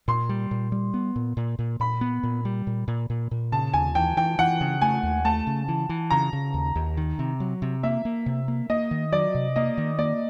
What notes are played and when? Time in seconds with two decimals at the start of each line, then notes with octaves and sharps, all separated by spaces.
0.08 A#2 C6
0.29 G3
0.51 A#2
0.72 G3
0.94 B3
1.16 A#2
1.37 A#2
1.59 A#2
1.80 A#2 B5
2.01 B3
2.23 A#2
2.45 G3
2.67 A#2
2.88 A#2
3.10 A#2
3.31 A#2
3.52 C#3 A5
3.74 D#2 G#5
3.95 E3 G5
4.17 E3 G5
4.39 E3 F#5
4.61 C#3
4.82 A3 G#5
5.03 D#2
5.25 A3 A5
5.47 C#3
5.68 E3
5.89 E3
6.11 C#3 A#5
6.33 C#3
6.54 D#2
6.75 D#2
6.97 D#3
7.19 C3
7.40 F#3
7.62 C3
7.83 A#3 E5
8.05 A#3
8.26 C3
8.48 A#3
8.70 A#3 D#5
8.91 D#3
9.12 F#3 D5
9.35 C3
9.56 A#3 D#5
9.78 D#3
9.99 A#3 D5